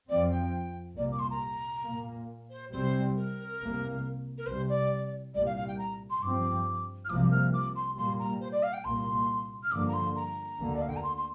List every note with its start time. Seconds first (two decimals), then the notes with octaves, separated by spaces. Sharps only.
0.09 F2 F3 C4 D5
0.31 G5
0.97 C2 A#2 A#3 D5
1.12 D6
1.19 C6
1.30 A#5
1.85 A#2 A#3
2.50 C5
2.72 C2 C3 G3 C4 C5
3.16 A#4
3.60 C2 C3 A#3
4.38 A#4
4.46 C2 C3 G3 C5
4.69 D5
5.34 C2 A#2 G3 D5
5.46 F5
5.57 F5
5.68 G5
5.78 A#5
6.10 C6
6.22 G2 F3 C4 D6
7.05 F6
7.09 C2 C3 F3 A#3 D6
7.32 F6
7.53 D6
7.76 C6
7.98 A#2 G3 A#3 C6
8.19 A#5
8.40 C5
8.52 D5
8.63 F5
8.73 G5
8.85 C2 A#2 A#3 C6
9.63 F6
9.72 G2 D3 F3 A#3 D6
9.88 A#5
9.94 C6
10.16 A#5
10.59 D2 D3 A#3
10.75 D5
10.82 F5
10.89 G5
10.96 A#5
11.03 C6
11.17 C6